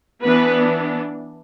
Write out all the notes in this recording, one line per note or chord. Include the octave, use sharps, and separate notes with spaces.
E3 B3 D4 B4